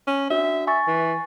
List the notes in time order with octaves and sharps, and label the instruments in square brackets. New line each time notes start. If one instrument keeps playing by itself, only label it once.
[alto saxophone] C#4
[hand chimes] D4 F#4 [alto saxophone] E5
[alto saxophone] E5 [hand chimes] G#5 C#6 A6
[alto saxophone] E3